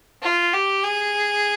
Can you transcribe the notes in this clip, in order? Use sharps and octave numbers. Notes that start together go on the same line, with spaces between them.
F4
G4
G#4